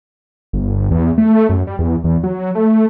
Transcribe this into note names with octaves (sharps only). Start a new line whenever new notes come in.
G1
E2
A3
F#2
G3
E2
E2
F#3
A3